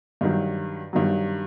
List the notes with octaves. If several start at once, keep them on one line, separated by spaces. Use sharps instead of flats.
G2 D#3 F#3
G2 D#3 F#3